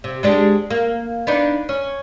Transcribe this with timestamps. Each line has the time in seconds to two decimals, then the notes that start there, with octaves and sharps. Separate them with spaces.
0.04 C3
0.23 G#3 D4 G4
0.70 A#3
1.27 B3 D4 D#4
1.69 C#4